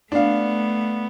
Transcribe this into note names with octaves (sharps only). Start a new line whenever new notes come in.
A3 B3 D4 F5